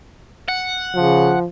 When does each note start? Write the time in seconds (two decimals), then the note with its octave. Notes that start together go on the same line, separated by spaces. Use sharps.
0.48 F#5
0.95 C#3 F3